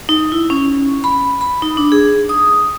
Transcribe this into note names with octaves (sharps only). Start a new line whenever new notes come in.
D#4
E4
C#4
B5
B5
D#4
D4
G#4
D#6